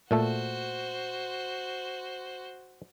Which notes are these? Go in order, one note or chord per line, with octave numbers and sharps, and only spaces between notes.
A#2 A3 F#4 A4 C5